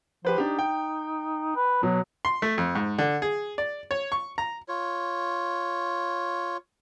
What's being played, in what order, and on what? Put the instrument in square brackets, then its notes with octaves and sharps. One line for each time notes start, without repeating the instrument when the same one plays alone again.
[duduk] F3 [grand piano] G4 B4 C5
[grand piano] D4 G4 [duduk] D#4
[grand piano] G5
[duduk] B4
[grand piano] B2 [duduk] F#3
[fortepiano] C6
A3
F2
G#2
D3
G#4
D5
C#5
C#6
A#5
[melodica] F4 C#5